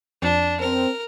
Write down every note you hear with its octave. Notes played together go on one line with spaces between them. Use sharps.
F2 D4
C4 A#4